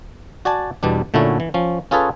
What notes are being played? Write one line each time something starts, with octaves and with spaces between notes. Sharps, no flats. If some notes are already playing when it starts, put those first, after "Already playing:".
F#4 D5 G#5 A5
E2 B2 G3 D4
A#2 D3 A3 C#4 E4 F#4
E3
F3 C#4
C#4 F4 G#4 A4 B4 C#5